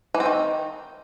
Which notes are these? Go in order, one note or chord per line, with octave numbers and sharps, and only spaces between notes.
E3
C4
D#3